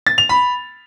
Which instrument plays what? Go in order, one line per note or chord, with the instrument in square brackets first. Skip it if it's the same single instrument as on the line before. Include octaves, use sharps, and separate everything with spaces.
[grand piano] A6
F7
B5